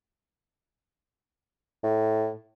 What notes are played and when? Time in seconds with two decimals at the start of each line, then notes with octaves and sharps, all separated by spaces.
1.83 A2